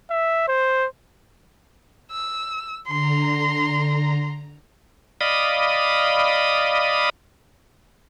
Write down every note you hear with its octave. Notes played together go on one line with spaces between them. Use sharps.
E5
C5
E6
D3 A#5 C6
D5 D#5 F5 B5 D#6